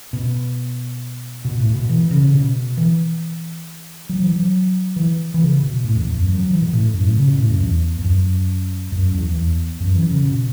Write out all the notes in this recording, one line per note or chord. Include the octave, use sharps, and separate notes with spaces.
B2
B2
A2
B2
E3
C#3
C#3
B2
E3
F#3
E3
F#3
E3
E3
C#3
B2
A2
E2
E2
F#2
F#3
F#3
E3
B2
A2
F#2
A2
C#3
B2
A2
F#2
E2
E2
F#2
F#2
E2
E2
F#2
E3
C#3
B2